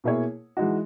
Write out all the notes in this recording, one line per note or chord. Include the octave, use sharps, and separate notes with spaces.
B2 A#3 E4 G#4 C#5
E3 G#3 D#4 F#4